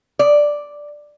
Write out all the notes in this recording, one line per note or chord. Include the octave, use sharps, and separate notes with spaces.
D5